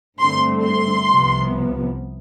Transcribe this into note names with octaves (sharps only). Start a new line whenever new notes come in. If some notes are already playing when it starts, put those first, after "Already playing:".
G2 D3 A3 C4 C6
C6
C2 C3 F3 B3